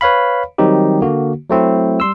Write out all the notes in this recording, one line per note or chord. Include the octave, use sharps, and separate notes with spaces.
B4 C#5 F5 B5
D#3 F#3 G3 C4 D#4 G4
D3 A#3 F#4
F#3 A3 C4 E4
G3 C6 E6